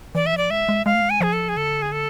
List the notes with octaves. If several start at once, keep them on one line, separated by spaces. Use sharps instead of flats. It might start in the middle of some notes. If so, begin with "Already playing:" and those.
E3 D5
E5
F3 D5
G#3 E5
G#3
G#3 F5
A3
G#3
G#5
F3 G#4
A4
G#4
D3 A4
G#4
A4